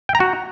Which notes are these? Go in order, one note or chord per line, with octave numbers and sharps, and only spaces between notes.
G5
A#5
F#4